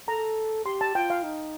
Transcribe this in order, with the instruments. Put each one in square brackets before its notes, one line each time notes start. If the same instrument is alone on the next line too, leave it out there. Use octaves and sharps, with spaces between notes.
[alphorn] A4 [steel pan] A#5
[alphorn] G4 [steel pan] C6
[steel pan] A5
[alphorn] F4 [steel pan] G5
[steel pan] F5
[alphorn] D#4